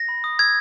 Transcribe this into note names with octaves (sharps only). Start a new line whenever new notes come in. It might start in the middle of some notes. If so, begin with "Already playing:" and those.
Already playing: A#6
B5
D#6
E6 G#6